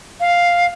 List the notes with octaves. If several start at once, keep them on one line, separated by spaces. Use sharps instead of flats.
F5